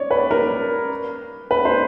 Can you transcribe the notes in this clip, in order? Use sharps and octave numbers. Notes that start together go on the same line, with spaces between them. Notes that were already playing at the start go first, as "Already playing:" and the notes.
Already playing: C#5 D5
B4
A#4
B4
C5